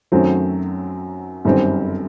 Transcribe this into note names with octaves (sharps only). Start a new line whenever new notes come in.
F#2 D#3 F#3 A3 C4
G1 F#2 D#3 G3 C4